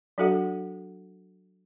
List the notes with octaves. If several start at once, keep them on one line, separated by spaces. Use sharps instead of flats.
F#3 D4 F#4 A4 E5 F#5